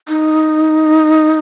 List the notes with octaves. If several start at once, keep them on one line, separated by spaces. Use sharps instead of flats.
D#4